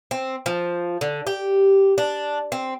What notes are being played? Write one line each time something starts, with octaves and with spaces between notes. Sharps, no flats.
C4
F3
D3
G4
D4
C4